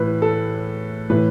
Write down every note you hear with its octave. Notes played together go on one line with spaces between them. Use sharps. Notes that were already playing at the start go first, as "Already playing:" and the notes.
Already playing: A2 E3 B4
A4
A2 E3 B4